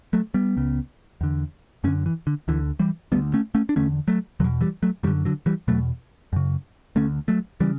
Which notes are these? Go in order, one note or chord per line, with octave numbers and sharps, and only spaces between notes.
F#3 A3
G3 B3
C#2 C#3
E2 D3
F#2 D3 A3 C#4
E3
D3
D2 D3 E3
E3 G3
D2 D3 G3 B3
A3 C#4
A3 C#4
D4
E2 D3 A3 C#4
F#3 A3
E2 B2 D3 F#3
E3 G3
F#3 A3
F#2 D3 E3 G3
D3 F#3
E3 G3
E2 B2 F#3 A3
F#2 C#3
D2 D3 A3 C#4
F#3 A3
C#3 E3 G3